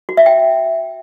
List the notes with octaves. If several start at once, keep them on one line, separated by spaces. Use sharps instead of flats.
F#4
E5
G5